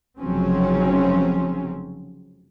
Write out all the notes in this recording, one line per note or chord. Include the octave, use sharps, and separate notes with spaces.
F1 C#3 F3 F#3 C4 C#4